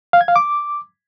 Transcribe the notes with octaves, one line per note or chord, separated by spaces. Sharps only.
F5
G#6
F5
D6